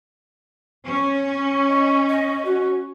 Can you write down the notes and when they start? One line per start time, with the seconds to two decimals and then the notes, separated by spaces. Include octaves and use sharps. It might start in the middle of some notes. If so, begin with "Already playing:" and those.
0.85 C#4
1.69 D#5
2.09 D#5
2.45 F#4